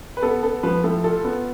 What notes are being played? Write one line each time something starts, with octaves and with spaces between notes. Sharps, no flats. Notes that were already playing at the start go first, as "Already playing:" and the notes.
B4
B3 A4
B3 A4
F3 B4
A2 A4
F4 A4
B3